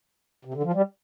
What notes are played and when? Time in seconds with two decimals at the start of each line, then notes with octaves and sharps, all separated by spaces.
0.45 C3
0.54 D3
0.63 F3
0.74 G3